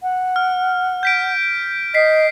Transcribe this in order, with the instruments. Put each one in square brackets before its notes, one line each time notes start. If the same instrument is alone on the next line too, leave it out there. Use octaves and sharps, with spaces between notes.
[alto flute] F#5
[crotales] F6
G6 B6 D7
[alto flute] D#5 [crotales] B6 C7